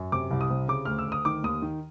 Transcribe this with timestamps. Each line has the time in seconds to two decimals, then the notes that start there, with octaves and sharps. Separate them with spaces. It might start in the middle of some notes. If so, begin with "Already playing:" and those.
Already playing: F#2
0.12 C3 D6
0.31 C2
0.41 D#6
0.50 C3
0.68 C#3 D6
0.85 D2 F6
0.98 E6
1.07 D2
1.12 D#6
1.25 D#3 D6
1.43 D#2 D#6
1.62 D#3